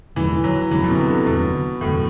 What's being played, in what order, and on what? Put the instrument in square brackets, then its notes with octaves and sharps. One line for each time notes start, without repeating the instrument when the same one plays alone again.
[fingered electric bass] F#1 E2 D3 [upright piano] E3
[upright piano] F#3
[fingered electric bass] F#1 E2 D3 [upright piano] E3
[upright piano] B2
C3
D3
[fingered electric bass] F#1 E2 D3 [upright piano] B2
[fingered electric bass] F#1 E2 D3 [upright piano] A2